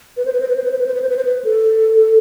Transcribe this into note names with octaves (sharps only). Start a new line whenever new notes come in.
B4
C5
B4
C5
B4
C5
B4
C5
B4
C5
B4
C5
B4
C5
B4
A4